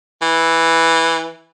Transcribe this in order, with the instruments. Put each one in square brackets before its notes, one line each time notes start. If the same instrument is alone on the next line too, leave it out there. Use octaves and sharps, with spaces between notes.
[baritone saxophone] E3